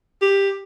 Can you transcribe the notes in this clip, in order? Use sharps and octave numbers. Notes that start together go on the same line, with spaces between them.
G4